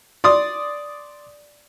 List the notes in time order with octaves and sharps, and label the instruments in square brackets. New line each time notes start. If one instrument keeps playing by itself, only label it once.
[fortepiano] D5 C6 D#6